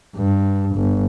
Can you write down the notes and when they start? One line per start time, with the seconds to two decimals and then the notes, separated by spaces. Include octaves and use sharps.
0.16 G2
0.75 G1